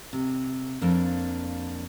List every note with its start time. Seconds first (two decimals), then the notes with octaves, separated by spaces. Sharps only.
0.13 C3
0.81 F2 A#3 D4